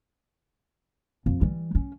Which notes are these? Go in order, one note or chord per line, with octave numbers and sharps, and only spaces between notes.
F2
E3 G3
C#4